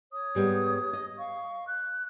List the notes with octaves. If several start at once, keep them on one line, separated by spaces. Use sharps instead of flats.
C#5 D#6
G#2 G3 B3
D#5
F5 C#6
F#6